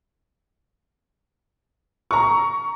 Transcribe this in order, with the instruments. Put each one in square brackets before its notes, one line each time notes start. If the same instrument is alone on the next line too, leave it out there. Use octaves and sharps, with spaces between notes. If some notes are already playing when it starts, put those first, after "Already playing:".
[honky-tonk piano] A#5 C#6